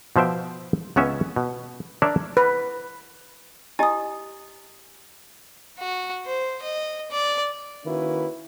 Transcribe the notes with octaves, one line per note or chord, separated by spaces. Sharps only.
B2 F3 C5 E5 G5
C#2 B3 C#4 E5
B2
D4 A#4 C#5 D5 E5
B4
E4 G4 D#5 G#5 D#6
F#4
C5
D#5
D5
D#3 A#3 C#4 E4 F#4 B4